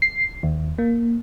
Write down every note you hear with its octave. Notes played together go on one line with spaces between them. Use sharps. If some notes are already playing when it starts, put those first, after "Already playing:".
C7
D#2
A#3